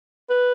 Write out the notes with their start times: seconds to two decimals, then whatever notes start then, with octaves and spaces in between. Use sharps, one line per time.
0.30 B4